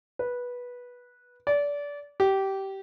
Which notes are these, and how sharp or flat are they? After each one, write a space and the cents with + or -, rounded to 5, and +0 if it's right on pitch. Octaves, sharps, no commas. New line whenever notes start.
B4 -15
D5 -25
G4 -20